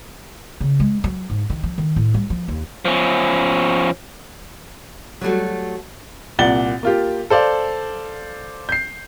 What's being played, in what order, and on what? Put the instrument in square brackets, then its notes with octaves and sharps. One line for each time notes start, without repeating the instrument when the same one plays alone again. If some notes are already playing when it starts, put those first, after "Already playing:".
[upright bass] C#3
G#3
F#3
G#2
D#3
F3
D#3
A2
G3
F3
D#2
[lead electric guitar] F3 C#4
[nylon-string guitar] F#3 G3 A3 F#4
[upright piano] C2 A#2 D5 F#5 A6 G7
A#3 F4 G4
A4 C5 D5 F5
G6 C7